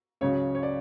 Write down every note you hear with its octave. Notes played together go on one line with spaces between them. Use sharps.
C#2 C#3 F#3 C#5
C#5
D5